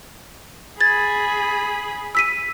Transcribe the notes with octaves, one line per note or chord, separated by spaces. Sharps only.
G#4 B5 G#6 A6
E6 B6 D#7